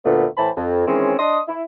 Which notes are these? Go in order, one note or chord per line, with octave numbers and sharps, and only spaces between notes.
D2 A#2 D3 A3 B3
A2 E3 C5 A5 B5
F2
D#3 E3 G#3 C4 C#4
D4 D#5 C6 D#6
E4